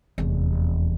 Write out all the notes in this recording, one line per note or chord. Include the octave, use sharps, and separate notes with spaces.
F1 E2